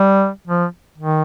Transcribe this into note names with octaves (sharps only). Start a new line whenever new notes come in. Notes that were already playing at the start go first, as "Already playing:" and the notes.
Already playing: G3
F3
D#3